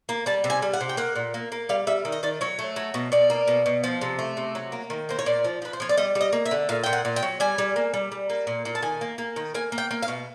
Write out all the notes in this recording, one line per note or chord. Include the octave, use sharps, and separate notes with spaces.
A#3
G3 A5
C3
G#5
G3
F#5
C3
G5
A#3 F#5
A#2
A#3
A#3
G3 F5
G3 E5
D#3
D#5
D#3 D5
F#3 C#5
A3
F#3
B2
B2 D5
A#3
B2
B2
F3
C3
A3
C3
F#3
A#3
D#3
A#3 C5
C#5
A#2 D5
F3
F3 B4
C5
F3 C#5
D5
G3 D#5
G3
D#5
A#3
E5
D3
A#2 F5
A#2 G5
F#5
A#2
G5
F#3
G3 G#5
G3
A#3
G3
G3
A#3
A#2
A#2
A5
D#3 G#5
A#3
A#3
D#3
A#3 G#5
A#3
G5
A#3
F5
B2